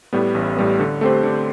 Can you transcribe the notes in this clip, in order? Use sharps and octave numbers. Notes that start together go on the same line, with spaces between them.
A2 G3 B3
A1
A2 G3 B3
D3
A3 C4 G4 C5
D3